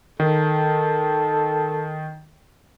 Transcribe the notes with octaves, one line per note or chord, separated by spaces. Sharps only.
D#3 A4